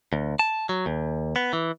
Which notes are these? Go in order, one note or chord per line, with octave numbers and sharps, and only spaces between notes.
D2
A5
F#3
D#2
B3
E3